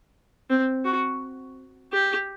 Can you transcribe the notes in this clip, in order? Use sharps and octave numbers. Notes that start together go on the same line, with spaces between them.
C4
F#4
G4